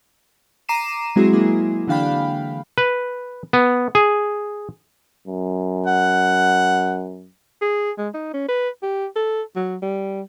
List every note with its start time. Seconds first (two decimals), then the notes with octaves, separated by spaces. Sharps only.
0.69 A#5 D6 C7 D#7 E7
1.16 F#3 G#3 C4 E4 F#4 G#4
1.33 G#3 A#3 E4 G#4
1.87 D3 E3 D4 F5 G5 B5
2.78 B4
3.53 B3
3.95 G#4
5.28 F#2
5.86 F#5
7.62 G#4
7.98 G#3
8.14 D#4
8.34 C#4
8.48 B4
8.82 G4
9.16 A4
9.56 F#3
9.82 G3